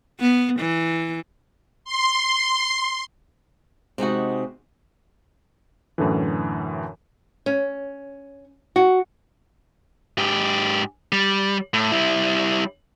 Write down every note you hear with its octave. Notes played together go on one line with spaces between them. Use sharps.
B3
E3
C6
C3 G#3 D#4 F#4
F#2 A2 D3 E3
C#4
F#4
G#2 G4
G3
A2
G3 E4